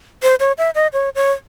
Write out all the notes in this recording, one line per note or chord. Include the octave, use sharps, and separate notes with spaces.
C5
C#5
E5
D#5
C#5
C#5